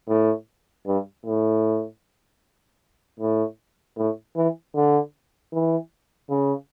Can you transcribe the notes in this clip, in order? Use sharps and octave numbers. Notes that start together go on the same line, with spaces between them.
A2
G2
A2
A2
A2
E3
D3
E3
C#3